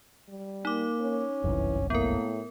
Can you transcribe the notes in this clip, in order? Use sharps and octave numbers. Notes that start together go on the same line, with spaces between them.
G3
A#3 D#4 D6
C#4
G1 C2 F#2 E3
A2 A#3 B3 A#4